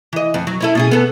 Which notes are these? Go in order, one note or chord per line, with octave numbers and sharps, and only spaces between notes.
E3 D#5
F2
F#3
C#4 E4 A4
B2 C#4 G#4
B3 A4